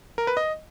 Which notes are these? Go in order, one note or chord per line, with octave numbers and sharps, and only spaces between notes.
A#4
B4
D#5